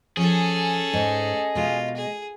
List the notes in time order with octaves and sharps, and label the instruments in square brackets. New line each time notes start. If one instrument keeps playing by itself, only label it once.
[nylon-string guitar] F3 [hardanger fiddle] C#4 A4 [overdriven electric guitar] G#4
[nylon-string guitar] G#2 [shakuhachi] D#5
[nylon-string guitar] B2 G#3 [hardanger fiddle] F4
[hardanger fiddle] G#4